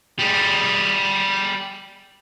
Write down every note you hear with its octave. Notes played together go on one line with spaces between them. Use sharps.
G3 G#4